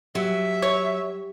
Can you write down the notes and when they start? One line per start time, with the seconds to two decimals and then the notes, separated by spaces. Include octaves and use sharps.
0.15 F#3 G4 E5
0.62 C#5